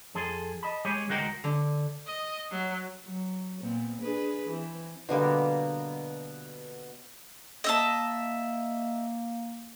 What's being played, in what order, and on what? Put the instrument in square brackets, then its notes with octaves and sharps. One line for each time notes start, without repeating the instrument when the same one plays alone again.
[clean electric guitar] F2 G#4 A4 C6
D#5 A5 B5
G#3 G4 G#4 C#5 G#5
D2 G#3 F#4 A#4 G5
[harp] D3
[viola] D#5
F#3
[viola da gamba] F#3
A#2 B3 C4
D4 G#4 B4
E3 C4
[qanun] B2 D3 G3 A#3
[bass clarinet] A#3 [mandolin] D#5 E5 A5